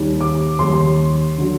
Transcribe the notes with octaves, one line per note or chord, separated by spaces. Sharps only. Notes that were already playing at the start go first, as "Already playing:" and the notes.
Already playing: D#2 D#3 G3
D6
D#2 D#3 G3 C6
D3 F#3